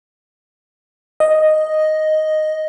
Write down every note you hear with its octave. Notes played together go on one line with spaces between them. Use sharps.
D#5